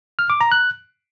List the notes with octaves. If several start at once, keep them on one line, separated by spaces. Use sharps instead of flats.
F6
D6
A#5
F#6